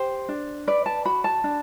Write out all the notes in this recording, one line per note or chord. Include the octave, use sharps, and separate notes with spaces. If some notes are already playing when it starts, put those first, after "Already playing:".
Already playing: G4 C5
D4
B4 D5
A5
F#4 B5
A5
D4